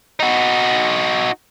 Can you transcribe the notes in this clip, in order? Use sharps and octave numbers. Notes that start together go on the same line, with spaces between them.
D#4 F#4